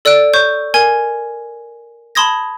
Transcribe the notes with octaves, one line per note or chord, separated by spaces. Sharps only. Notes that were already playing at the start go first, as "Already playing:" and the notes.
A4 D5 E6 F#6 D7
C#5 C#6 G6
A#4 G#5 G#6
A5 B5 C6 D#6 G#6 A#6